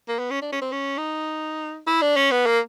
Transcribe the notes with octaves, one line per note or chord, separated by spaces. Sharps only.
A#3
B3
C#4
D4
C#4
C4
C#4
D#4
E4
D4
C#4
B3
A#3